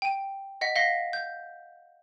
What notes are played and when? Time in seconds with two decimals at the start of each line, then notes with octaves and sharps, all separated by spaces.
0.02 G5 D#7
0.61 D#5 F#5 B6
0.76 F5 F#5 A#6 B6 G7
1.13 G6